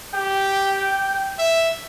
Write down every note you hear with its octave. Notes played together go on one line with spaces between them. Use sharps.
G4 G5
E5